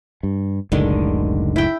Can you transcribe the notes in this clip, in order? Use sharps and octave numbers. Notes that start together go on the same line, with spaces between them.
G2
F#1 C#2 A2 D3 D#3 G#3
E4 G5